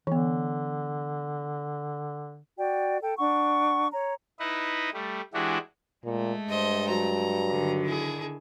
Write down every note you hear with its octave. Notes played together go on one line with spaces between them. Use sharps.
D3 E3 B3
F#4 D5 G5
A4 G5
D4 F#5 C#6
C#5 A#5
D#4 E4 B4 D#5
G3 A3
E3 G#3 D4 E4 F#4 G4
A#2 G#3 A3
G2 C5 D#5
F#3 A#5
D3 D#3
E4 G#4